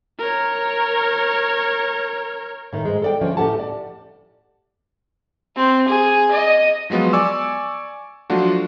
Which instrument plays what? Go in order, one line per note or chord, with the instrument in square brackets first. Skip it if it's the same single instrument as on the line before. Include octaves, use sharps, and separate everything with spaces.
[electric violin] A#4 C#5
[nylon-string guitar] A2 D#3
G#2 G#3
A4 D5 G5
D2 F3 C#4 D4
A2 G4 A4 F#5 A5
D5
[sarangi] C4
G#4
D#5
[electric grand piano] F3 F#3 G#3 B3 F4
D5 G#5 C#6 D6 E6
F3 F#3 A3 D4 F4 F#4